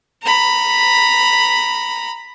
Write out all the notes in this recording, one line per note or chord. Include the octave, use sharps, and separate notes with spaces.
A#5 B5